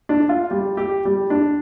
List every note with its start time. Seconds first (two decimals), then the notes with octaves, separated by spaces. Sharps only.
0.09 D4
0.29 F4
0.51 G3
0.77 G4
1.05 G3
1.30 D4